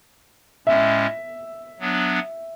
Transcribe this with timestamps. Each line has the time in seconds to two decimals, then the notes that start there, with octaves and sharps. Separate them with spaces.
0.67 A2 G#3 C#4 E5
1.80 F#3 B3 D4